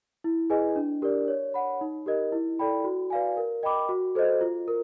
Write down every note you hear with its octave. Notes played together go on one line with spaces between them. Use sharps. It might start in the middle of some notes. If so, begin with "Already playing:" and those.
E4
G#4 B4 D#5 G#5
D4
G4 A#4 D5
C#5
F#5 B5
D#4
G4 A#4 D#5
E4
A4 D5 G5 B5
F#4
B4 D5 F5 G#5
A#4
D#5 G5 B5 D6
F#4
A4 C5 D#5
F4
A#4